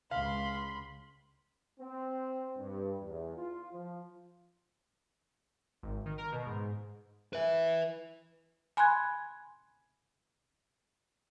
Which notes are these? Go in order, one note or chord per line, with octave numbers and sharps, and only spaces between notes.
C#2 F5 B5 C6
C4
G2
E2
F4
F3
G#1
D#3
A#4
B2
G#2
B4 E5
G#5 B5 C6 F#6 G#6